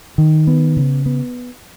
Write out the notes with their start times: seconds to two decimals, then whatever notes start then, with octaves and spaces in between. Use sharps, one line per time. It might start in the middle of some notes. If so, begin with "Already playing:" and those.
0.18 D#3
0.47 B3
0.77 C#3
1.06 B3